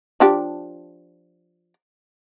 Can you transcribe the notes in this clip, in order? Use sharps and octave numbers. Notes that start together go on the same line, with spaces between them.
F3 D4 G4